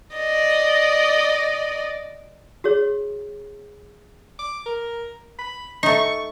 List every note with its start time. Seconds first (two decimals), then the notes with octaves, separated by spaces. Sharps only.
0.16 D5 D#5
2.64 F#4 G#4 C#5
4.39 D6
4.66 A#4
5.39 B5
5.83 A3 D#4 C#6